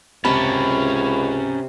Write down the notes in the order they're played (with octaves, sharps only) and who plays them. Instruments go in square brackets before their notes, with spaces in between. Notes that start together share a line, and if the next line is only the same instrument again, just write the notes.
[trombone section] C#2 [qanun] C3 A5 [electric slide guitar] C#4 A#4 [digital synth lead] B5